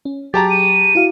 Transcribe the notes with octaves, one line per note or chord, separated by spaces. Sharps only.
C#4
F#3 G4 G#4 A5 A#5 C#6 A6
D#7
E4 F#4 F5